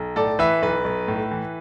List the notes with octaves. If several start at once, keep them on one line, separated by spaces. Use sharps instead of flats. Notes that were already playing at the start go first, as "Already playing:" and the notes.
Already playing: B1
A2 A4 D5
E3 B4 E5
B1 B4
B1
A2
E3